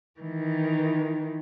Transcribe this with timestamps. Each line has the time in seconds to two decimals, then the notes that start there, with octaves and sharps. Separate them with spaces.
0.21 D#3 E3